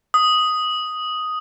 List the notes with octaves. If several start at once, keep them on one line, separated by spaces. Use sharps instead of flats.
D#6